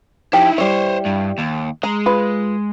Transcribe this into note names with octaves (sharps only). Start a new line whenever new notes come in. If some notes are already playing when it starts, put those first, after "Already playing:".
F3 D#4 E4 G4
G3 E4 C5 C#5
G2
D#2
G#3 A#5
F4 B4